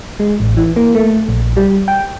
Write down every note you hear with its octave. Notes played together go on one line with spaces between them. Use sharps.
G#3
A1
E3
A#3
A3
A#1
G3
G5